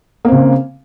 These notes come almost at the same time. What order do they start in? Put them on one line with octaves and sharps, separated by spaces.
A#3 C4 C#3